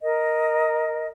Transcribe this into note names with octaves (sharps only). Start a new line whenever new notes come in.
A#4 D#5